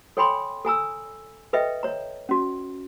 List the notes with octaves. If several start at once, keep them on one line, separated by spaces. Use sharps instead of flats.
A4 C#5 G5 G#5 B5 C6
A4 G#5 A#5 E6
A4 B4 D#5 E5 G5
C#5 A#5
C#4 F#4